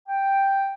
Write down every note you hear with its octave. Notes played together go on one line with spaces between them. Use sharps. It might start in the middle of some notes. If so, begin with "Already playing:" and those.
G5